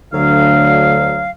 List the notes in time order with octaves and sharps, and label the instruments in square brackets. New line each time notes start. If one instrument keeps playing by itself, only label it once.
[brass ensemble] D2 D3 [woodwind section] F#3 F5